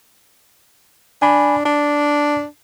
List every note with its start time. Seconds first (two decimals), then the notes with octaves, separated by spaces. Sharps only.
1.22 D4 G#5 B5
1.65 D4 A5